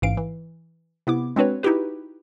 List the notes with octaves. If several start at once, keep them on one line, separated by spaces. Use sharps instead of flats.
A1 G#2 E3 F5 D7
E3
C3 B3 E4 D6
G#3 C4 D4 F#4 B4 C#5
D#4 E4 F#4 G4 B4